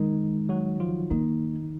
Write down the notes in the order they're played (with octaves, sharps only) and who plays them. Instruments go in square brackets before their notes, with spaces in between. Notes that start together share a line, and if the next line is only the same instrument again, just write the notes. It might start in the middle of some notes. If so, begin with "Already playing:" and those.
Already playing: [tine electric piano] D#3 D#4 [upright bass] G#3
[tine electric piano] F#3 F#4
F3 F4
[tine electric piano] D#3 D#4 [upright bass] A#3